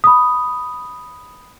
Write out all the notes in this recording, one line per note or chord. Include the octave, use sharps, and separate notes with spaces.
B5 D#6